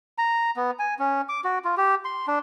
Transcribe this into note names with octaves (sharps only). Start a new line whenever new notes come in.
A#5
B3
G#5
C#4
D6
F#4
F4
G4
C6
D4